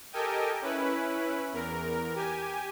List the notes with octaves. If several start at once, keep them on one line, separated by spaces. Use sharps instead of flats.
G4 A4 A#4 D#5 G5 G#5
C#4 E4 B4
E2 A#4
G4 G#5